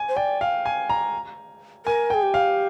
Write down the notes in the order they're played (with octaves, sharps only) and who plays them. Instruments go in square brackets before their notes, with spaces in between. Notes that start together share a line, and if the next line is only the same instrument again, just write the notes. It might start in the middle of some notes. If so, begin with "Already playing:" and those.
Already playing: [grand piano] G#5
[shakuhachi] C5
[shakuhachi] D5 [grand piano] G5
[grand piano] F5
G#5
A#5
[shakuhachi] A#4 [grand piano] G#5
[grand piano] G5
[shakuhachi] G#4
G4
[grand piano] F5